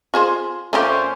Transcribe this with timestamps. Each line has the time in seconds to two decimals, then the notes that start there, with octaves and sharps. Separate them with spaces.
0.14 F4 G#4 C5
0.73 A#2 A3 C#4 F4 G4 C5